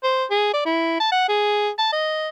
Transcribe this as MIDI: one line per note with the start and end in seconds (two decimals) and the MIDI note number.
0.03 0.25 72
0.30 0.53 68
0.54 0.62 74
0.65 1.00 64
1.00 1.08 81
1.12 1.28 78
1.29 1.70 68
1.79 1.91 81
1.92 2.29 75